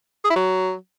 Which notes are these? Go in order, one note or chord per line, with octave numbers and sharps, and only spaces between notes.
G#4
E4
F#3